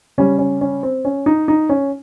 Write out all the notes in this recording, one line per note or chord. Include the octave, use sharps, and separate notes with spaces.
C#3 G3 C#4
C#4
C#4
C4
C#4
D#4
D#4
C#4